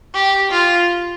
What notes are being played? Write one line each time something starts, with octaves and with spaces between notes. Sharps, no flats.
G4
F4